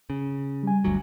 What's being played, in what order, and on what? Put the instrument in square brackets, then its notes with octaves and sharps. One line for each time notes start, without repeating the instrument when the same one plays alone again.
[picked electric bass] C#3
[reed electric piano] G3 G#5
[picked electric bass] G1 D2 F#3